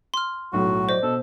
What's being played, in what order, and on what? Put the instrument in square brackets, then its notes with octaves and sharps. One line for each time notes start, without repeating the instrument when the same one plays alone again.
[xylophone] C6 F6
[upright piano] B1 A2 [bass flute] F#3 [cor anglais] F#4
[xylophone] C5 D#5 [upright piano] D5
[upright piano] B2 [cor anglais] A4